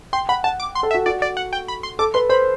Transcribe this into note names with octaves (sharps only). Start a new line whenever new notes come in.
G5 C6
F#5 B5
F#5 A5
D6
C6
A4
E5
F#4
F#4 D5
D5
F#5
G5
B5
C6
A4 D6
B4 C6
C5 B5